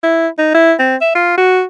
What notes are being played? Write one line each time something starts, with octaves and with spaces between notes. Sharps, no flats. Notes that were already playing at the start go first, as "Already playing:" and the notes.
E4
D#4
E4
C4
E5
F4
F#4